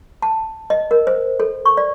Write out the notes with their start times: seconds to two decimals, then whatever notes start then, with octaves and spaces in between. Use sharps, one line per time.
0.22 A5
0.70 D#5
0.91 A#4
1.07 C5
1.40 A4
1.65 C#6
1.77 D5